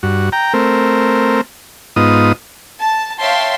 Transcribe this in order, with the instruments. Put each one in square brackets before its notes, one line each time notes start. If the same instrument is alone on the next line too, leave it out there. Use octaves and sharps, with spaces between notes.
[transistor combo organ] G2 F#4
G5 A#5
A3 C4 A#4
G#2 B3 D#4 F4 D#6
[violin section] A5
C#5 E5 F5 G5 A5 C6